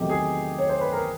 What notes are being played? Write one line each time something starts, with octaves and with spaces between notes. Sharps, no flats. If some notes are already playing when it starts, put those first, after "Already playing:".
Already playing: E2 C3 D#3 F#3 A3 G4
G#4
C#5
C5
B4
A#4